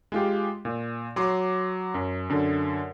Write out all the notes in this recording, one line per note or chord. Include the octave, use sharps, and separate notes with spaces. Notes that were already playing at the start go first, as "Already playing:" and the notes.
G#3 F4 G4
A#2
F#3 C6 D6
F#2
F#2 D3